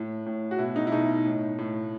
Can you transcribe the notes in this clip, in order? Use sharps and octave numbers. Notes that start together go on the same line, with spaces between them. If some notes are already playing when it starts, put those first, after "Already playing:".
Already playing: A2
A2
F#4
B2 E4
D#4
E4
B2 D#4
A2
A2